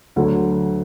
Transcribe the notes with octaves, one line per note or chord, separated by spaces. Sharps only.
D2 D3 F#3